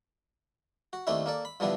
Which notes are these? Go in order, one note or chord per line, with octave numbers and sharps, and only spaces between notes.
F#4
D#2 A3 C4 D4 E4 E5
A#3 A4 D5
B5
G2 D3 F3 B3 D4 E4